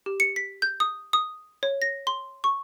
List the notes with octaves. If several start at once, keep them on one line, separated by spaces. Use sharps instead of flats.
G4
C#7
B6
G6
D#6
D#6
C#5
A#6
C6
C#6